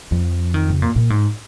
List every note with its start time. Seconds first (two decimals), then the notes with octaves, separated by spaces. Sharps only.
0.11 F2 F3
0.54 D#3
0.68 C#3
0.82 A#2
0.96 A#2
1.10 G#2